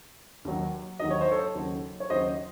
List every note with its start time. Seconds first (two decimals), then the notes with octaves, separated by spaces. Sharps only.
0.45 D#2 D#3 F#3
0.99 D#2 D#3 F#3 D#5
1.11 C#5
1.21 C5
1.32 A4 C#5
1.55 D#2 C#3 F#3
2.00 C#5
2.10 D#2 C#3 F#3 C5 D#5